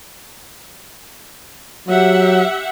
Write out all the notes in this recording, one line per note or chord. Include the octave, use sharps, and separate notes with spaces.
F#3 G4 E5 F#5